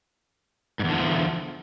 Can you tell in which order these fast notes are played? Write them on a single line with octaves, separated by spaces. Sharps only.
G#2 E2 D3 F3